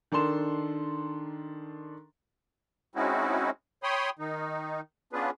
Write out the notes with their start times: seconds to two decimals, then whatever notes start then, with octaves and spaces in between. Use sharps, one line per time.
0.12 D#3 D4 A4 C6 E7
2.95 G#3 C4 C#4 D#4 E4 F#4
3.83 C#5 G5 B5 C6 D#6
4.19 D#3 D#4
5.13 B3 C#4 D4 F4 G#4 B4